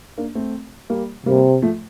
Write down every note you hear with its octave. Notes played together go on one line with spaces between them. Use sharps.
A#3 D4
A3 C4
G3 A#3
C3 G3 A#3
F3 A3